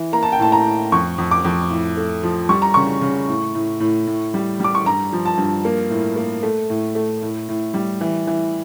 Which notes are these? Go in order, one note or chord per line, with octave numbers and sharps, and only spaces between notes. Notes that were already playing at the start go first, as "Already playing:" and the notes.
Already playing: E3
A#3 A#5
A5
G5
A2 A5
A#5
A2
F2 C#6
F2
D6
F2
A2
A3
F3
G3 C#6
A#5
C#3 C#6
C#3
A2
A2
A2
A2
G3
G3 D6
C#6
G2 A#5
F3
A5
G2
A#3
A2
A#3
A3
A2
A3
A2
A2
G3
E3
E3